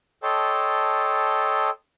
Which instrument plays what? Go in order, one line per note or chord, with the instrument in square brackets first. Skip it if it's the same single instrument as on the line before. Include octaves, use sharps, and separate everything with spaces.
[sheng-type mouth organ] A4 C#5 D#5 G5 A5 C6